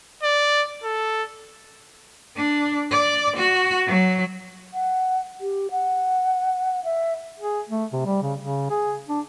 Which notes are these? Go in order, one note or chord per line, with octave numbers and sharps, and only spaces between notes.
D5
A4
D4
D5
F#4
F#3
F#5
G4
F#5
E5
G#4
A3
C3
G3
C#3
C#3
G#4
D4